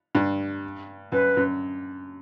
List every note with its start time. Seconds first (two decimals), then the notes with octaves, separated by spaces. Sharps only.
0.15 G2
1.12 F#2 B4
1.37 F#2